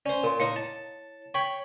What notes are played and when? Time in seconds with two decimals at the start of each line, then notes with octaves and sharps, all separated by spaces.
0.06 C#4 C5 D5
0.23 A#2 A#4 C6
0.40 A#3 D#4 E4 A#4 C#5 C#7
0.56 A5
1.34 C#5 G5 B5 C#6